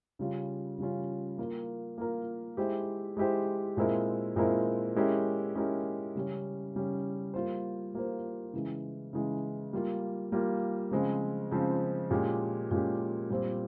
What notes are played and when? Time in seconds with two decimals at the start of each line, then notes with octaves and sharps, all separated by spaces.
0.19 C#3 G3 C#4 F4
0.78 C#3 G3 C#4 F4
1.38 A#3 F4 A#4
1.98 A#3 F4 A#4
2.57 G#3 E4 G4 C5
3.17 G#3 E4 G4 C5
3.77 A#2 G#3 C4 E4 A#4
4.36 A#2 G#3 C4 E4 A#4
4.96 G#3 C#4 E4 G4 A#4
5.55 G#3 C#4 E4 G4 A#4
6.15 C#3 G3 C#4
6.75 C#3 G3 C#4
7.34 G3 A#3 F4 C5
7.94 G3 A#3 F4 C5
8.53 C#3 E3 G#3
9.13 C#3 E3 G#3
9.73 G3 A#3 F4
10.32 G3 A#3 F4
10.91 C#3 F3 G#3 C4
11.51 C#3 F3 G#3 C4
12.10 A#2 G#3 C#4 G4
12.71 A#2 G#3 C#4 G4
13.30 A#2 G3 C4 F4 C5